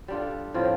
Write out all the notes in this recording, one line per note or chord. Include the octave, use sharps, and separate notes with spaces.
G3 D4 F4 A4
A2 F3 C4 F4